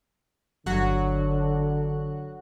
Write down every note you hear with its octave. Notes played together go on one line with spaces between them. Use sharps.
G1 D3 F#3 F#4 F#6